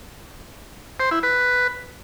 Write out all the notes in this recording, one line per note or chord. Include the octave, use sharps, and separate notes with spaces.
C5
E4
B4